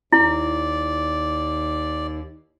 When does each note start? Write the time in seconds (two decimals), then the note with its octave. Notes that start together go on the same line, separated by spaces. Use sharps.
0.13 D#2 E4 D5